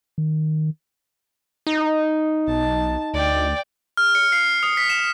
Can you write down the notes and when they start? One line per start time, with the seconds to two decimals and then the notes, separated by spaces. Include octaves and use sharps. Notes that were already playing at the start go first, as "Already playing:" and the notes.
0.18 D#3
1.67 D#4
2.47 B1 A5
3.14 D2 D5 G5
3.97 F6
4.15 C#7
4.32 C7
4.63 D#6
4.77 B6
4.89 E7